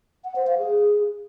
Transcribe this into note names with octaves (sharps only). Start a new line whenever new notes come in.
F#5
C5
F5
G#4